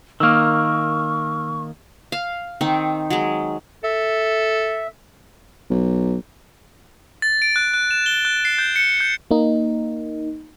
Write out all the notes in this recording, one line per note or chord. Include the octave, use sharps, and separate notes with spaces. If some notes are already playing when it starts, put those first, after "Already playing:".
D#3 A#3 C#6 E6 F6
F5
D#3 C4 D#4
F#3 G#3
A4 E5
B1
A6
D7
F#6
F#6
E7
G7
F#6
C7
G6
C#7
G6
A#3 D#4